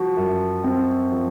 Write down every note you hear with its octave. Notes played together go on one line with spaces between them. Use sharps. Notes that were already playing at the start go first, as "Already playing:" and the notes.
Already playing: F3 F#4
F#2
C4
F3